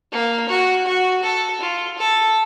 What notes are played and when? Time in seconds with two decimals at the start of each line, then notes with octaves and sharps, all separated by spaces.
0.12 A#3
0.49 F#4
0.86 F#4
1.23 A4
1.61 F4
1.98 A4